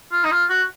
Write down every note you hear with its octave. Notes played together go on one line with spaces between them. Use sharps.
F4
D#4
F4
F#4